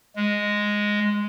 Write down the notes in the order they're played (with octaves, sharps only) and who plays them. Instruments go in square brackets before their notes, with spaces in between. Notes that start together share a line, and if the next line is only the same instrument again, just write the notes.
[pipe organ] G#3